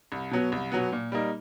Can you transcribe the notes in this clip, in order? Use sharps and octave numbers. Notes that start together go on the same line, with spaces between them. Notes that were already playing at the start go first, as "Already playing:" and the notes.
C2
B2 F#3 B3
C2
B2 F#3 B3
A#2
G3 A#3 D#4